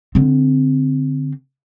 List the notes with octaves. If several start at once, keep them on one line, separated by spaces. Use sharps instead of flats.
D3 C4